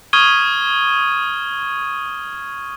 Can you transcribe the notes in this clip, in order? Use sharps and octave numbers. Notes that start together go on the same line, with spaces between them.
C#6 D#6 F6 G#6 D#7 G7